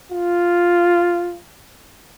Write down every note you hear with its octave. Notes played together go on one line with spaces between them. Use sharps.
F4